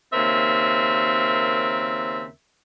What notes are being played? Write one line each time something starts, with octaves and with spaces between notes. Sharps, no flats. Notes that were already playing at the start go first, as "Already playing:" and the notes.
D#2 C#3 C4 A#4 E5